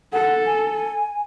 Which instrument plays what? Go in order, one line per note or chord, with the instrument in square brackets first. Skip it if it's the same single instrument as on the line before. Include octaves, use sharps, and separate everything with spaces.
[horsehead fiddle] A4 [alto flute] F#5
[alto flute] G#5